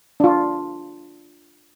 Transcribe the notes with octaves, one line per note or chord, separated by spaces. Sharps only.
D4 F4